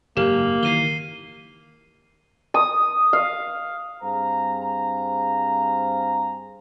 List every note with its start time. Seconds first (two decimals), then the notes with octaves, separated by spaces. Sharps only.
0.17 F#1 G#2 A#3 G4
0.63 D#3 E3 C7 D#7 G7
2.54 D#6
3.13 F5
4.02 G2 C4 G#4 C5 F5 A#5